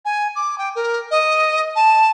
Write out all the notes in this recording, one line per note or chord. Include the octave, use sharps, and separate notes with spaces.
G#5
D6
G5
A#4
D#5
A5